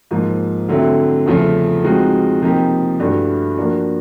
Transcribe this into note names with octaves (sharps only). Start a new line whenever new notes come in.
G#2 F3 A#3
D3 F#3 A3 C4 E4
E2 C#3 F3 A3
F3 G#3 C4 D#4 F#4
C3 F3 A#3 D#4 G4
G2 E3 A3 D4 F#4
F3 A#3 D4 F#4